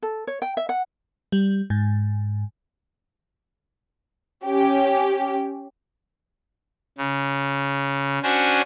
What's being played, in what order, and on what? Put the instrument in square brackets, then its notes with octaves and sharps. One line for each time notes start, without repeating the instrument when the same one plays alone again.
[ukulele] A4
C#5
G5
E5
F#5
[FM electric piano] G3
G#2
[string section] C#4 G4
[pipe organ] C#3
C#4 D4 F#4 C5 G#5